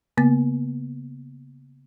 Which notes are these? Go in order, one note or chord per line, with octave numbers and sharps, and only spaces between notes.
C#3 A#3 B3 A6